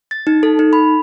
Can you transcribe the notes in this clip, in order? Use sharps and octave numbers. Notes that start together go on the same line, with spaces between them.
A6
D#4
A4
D#4
B5